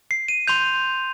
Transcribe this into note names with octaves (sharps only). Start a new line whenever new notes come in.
C7
D#7
C6 G6 F7